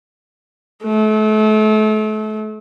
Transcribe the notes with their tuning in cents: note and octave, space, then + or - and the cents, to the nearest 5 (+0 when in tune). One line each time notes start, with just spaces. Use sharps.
A3 -35